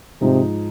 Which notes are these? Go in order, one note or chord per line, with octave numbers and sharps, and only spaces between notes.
G#2 C3 F3 G#3 D#4